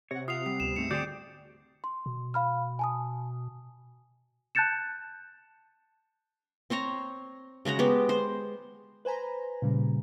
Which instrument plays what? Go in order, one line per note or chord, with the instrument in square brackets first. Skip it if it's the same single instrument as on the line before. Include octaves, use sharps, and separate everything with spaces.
[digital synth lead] C3 [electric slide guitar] C#5 [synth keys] F#5 A#6
[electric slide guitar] F4 [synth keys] E5 F#5 [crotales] D#6 C7 F7
[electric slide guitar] G3 [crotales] C7
[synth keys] D2 B3 [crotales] E7
[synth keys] G#2 A3 C4 [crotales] C#7
[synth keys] D3 C4 E7 [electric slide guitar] F#4 G#4 G5 [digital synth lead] D5 [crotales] G6
[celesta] C6
[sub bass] B2
[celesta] F5 B5 F6
G#5 A5 D#6
A5 F#6 G6 A6 C#7 E7
[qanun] C4 C5 C#5 A#5
C#3 G#3 F#4 A#5
G#3 B3 G4
C5
[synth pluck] B4 C5 G#5 A#5 B5
A#2 C#3 G3